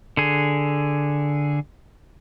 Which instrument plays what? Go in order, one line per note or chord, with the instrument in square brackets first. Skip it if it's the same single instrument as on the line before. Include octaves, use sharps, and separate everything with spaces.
[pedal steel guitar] D3 G#4